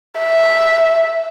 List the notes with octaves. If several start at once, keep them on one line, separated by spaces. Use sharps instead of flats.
E5